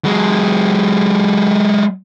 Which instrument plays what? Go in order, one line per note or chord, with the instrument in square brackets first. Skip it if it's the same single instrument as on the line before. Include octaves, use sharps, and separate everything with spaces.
[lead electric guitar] F#3 G#3